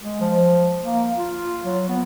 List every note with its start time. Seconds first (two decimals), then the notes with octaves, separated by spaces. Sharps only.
0.02 G#3
0.21 F3
0.82 A#3
1.16 F4
1.64 F#3
1.88 B3